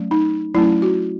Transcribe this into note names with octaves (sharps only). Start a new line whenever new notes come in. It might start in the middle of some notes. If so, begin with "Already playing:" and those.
Already playing: F#3 A3 C#4
D#4
F#3 A3 C#4 E4
F#4